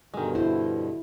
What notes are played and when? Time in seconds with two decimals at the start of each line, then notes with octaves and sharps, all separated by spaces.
0.14 G2 B2 D3 D#3 G#3
0.35 E4 C5